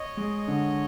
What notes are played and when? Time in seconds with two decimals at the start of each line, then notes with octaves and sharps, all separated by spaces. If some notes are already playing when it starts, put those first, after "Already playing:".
Already playing: C#5 D#5
0.17 G#3
0.48 D3